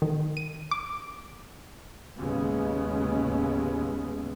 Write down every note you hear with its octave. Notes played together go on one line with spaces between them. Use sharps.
D#3
D#7
D6
D#2 A2 C#3 G#3 B3